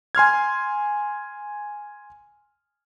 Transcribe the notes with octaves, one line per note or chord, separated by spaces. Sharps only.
G#5 C6 F6 G#6